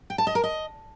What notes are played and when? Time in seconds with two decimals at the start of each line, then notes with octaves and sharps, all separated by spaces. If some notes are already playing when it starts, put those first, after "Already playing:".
0.10 G5
0.18 A5
0.27 D#5
0.35 A#4
0.43 D#5